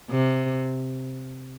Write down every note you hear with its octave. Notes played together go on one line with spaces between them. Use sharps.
C3